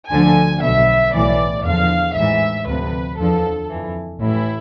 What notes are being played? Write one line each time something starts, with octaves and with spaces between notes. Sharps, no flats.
D2 D3 F3 G#5
B1 B2 E5
B1 A2 E3 D5
E2 D3 F3 F5
A1 G#2 E3 E5
D2 C3 F3 B4
E2 D3 F3 A4
F2 E3
A1 A2 E3 E4